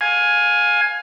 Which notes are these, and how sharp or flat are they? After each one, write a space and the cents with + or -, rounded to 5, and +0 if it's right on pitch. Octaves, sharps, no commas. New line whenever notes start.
F5 +25 G#5 +0